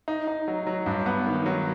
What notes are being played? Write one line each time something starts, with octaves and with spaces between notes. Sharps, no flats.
D#4
D#4
F#3
F#3
G2
B3
D#3
F#3